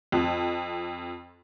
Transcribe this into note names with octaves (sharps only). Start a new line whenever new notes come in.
F2